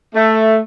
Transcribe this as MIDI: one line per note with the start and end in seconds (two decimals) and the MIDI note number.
0.15 0.58 57